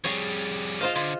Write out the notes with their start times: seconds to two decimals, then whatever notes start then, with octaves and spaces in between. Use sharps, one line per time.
0.04 F2 G3 G#4 C#5
0.81 D#2 F4 C5 D#5 F5
0.96 D3 F4